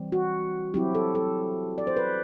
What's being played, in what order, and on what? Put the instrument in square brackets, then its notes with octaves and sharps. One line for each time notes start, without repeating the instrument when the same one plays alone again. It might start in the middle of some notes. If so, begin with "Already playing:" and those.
Already playing: [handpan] E3 G3 C4
F#4
F#3 C4 E4 G4
A4
A4
D5
C5
B4